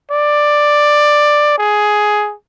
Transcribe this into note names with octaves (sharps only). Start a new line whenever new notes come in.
D5
G#4